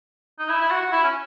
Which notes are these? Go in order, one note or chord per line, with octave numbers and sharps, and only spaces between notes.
D#4
E4
E4
F#4
F#4
E4
C#4